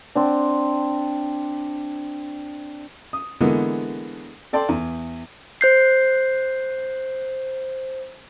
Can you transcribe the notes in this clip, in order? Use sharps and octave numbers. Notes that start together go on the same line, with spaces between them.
C4 D4
D#6
D3 E3 G#3 A#3 B3
A4 D5 G5 A5 C6
E2
C5 G6 C7